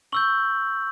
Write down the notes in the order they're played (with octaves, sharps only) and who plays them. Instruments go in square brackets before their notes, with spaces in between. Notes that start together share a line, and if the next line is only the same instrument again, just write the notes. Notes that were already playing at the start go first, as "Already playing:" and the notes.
[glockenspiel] C#6 E6 G6 F#7